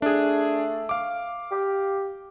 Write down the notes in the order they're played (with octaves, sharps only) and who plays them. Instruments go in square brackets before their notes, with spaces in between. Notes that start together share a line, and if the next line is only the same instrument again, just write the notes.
[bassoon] A3 [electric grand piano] D4 G#4
[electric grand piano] F5 D6
[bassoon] G4